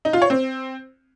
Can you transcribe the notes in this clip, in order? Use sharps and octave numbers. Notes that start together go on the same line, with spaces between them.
D#4
F4
C#5
C4